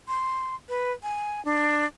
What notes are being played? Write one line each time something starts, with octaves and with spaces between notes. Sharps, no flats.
C6
B4
G#5
D4